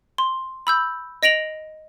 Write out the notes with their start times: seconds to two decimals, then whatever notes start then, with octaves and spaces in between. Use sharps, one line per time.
0.18 C6
0.67 B5 E6 G6
1.23 D#5 A#6 D7 F7 F#7